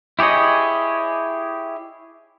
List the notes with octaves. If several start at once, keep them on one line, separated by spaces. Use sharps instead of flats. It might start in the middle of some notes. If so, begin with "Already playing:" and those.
E4 G4 G#4 C#5 D#5